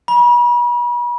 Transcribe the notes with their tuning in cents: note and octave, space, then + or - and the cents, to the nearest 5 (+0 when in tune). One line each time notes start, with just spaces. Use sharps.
B5 -40